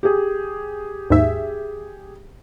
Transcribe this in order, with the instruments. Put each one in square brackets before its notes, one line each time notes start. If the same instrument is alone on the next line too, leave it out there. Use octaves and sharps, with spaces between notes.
[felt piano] G4 G#4
[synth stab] D#2 G#2 E5